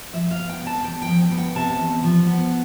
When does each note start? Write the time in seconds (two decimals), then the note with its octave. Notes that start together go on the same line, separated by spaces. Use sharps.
0.13 F3 E5
0.31 F5
0.37 B3
0.49 G5
0.61 C3
0.67 A5
0.84 E2 G5
1.02 G5
1.08 F3
1.20 G5
1.31 B3
1.38 G5
1.55 C3 A5
1.79 E2
2.03 F3
2.27 B3